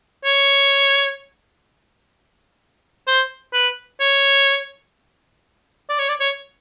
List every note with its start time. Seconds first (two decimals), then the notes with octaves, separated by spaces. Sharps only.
0.25 C#5
3.07 C5
3.54 B4
4.01 C#5
5.89 D5
5.99 C#5
6.09 D5
6.20 C#5